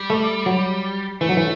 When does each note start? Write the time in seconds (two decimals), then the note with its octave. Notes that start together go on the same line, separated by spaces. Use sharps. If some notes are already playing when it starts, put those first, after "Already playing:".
Already playing: G3
0.10 A3
0.46 F#3
1.21 E3 A3
1.29 F#3
1.37 E3